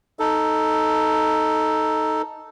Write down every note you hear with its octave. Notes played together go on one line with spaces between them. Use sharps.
D#4 A4